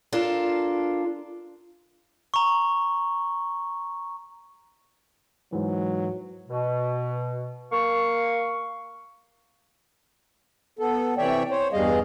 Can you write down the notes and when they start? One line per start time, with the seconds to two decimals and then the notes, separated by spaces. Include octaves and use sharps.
0.12 D4 F4 A4 A#4
2.34 A#5 C#6
5.53 G#2 E3 F#3
6.49 B2
7.71 A#3 F5 C#6
10.79 B3 A4
11.18 C3 E3 C#5 D5 E5 G5
11.51 C5 C#5
11.73 E2 G2 G3 G#4 D#5 F5